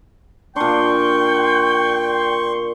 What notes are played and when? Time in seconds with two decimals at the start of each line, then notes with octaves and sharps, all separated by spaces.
0.56 A#2 D4 G5 C6 C#6